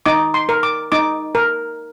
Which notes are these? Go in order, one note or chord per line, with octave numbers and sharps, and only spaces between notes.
D#4 D6
C6
A#4
D6
D#4 D6
A#4